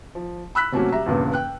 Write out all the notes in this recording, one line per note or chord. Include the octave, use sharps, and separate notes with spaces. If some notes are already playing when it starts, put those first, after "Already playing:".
F3
B5 E6 F#6 B6
C3 F#3 A3 A#3 C#4 F#4
G3 E5 A#5
E2 G2 A#2 C#3
G5 F#6